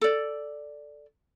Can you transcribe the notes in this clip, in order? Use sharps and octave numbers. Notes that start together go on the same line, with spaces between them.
A4 D5